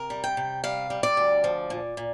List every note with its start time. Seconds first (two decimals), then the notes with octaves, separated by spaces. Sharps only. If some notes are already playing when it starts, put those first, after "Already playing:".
Already playing: C3 A#4
0.10 G3
0.24 G5
0.37 C3
0.64 G3 F5
0.90 G3
1.03 D5
1.17 D2
1.44 F3
1.70 A#2
1.97 A#2